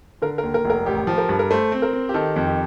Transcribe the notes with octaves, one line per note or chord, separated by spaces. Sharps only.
D3 A#4
A#4
D#2
A#4
F1
A#4
A1 G4
F3
A#4
G2
A#4
A3 C5
C4
A#4
C4
G4
D#3 A4
F2
G4